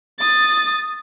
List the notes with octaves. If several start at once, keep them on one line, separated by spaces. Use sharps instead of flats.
D#6 A6